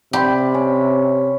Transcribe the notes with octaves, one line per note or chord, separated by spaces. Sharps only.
C3 G4 D5 B5 C6
C#4